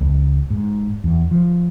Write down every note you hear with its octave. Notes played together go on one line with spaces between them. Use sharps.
C#2
G#2
E2
F3